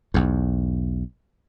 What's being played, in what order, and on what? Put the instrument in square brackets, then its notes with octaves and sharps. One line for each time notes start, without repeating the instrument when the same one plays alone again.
[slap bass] B1 E2